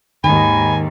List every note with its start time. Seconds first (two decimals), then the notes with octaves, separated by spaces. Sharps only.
0.24 D#2 G#2 D#3 G#5 B5